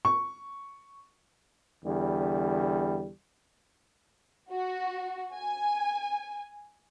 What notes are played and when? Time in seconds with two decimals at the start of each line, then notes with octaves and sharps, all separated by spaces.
0.05 C#6
1.84 E2 D3 G3
4.51 F#4
5.34 G#5